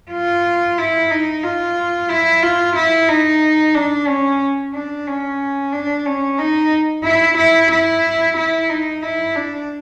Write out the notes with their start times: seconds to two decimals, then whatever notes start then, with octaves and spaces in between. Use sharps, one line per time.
0.12 F4
0.78 E4
1.11 D#4
1.44 F4
2.10 E4
2.42 F4
2.76 E4
3.09 D#4
3.74 D4
4.08 C#4
4.74 D4
5.07 C#4
5.73 D4
6.06 C#4
6.39 D#4
7.04 E4
7.37 E4
7.70 E4
8.37 E4
8.69 D#4
9.03 E4
9.35 D4